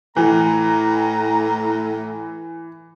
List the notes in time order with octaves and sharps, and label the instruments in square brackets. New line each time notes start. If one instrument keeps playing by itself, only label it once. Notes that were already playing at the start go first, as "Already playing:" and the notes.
[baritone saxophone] A2 [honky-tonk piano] E3 [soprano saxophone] A#5